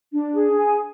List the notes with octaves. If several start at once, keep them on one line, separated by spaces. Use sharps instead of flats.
D4
G#4
G#5